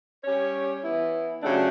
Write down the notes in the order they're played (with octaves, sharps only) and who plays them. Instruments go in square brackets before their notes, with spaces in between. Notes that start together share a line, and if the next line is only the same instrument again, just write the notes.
[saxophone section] G3 C#4 G4 C#5
E3 B3 E4
C#3 F#3 A3 D4 G4